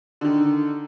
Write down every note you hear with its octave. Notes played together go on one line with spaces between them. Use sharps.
D3 D#3